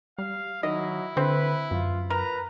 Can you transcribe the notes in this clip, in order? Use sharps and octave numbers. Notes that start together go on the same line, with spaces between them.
G3 F5
D#3 F#3 E4 D#5
D3 C4 B4
F#2 F4
A#4 B4 A#5